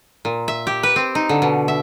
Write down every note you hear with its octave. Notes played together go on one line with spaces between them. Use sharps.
A#2
E5
G4
B4
C4
D#4
D3
B2
E5